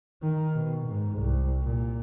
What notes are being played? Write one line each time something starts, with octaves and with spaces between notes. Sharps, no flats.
D#3
B2
G#2
C2
A#2